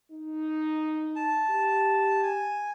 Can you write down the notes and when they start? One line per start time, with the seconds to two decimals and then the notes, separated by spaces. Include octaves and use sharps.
0.11 D#4
1.16 A5
1.50 G4
2.23 G#5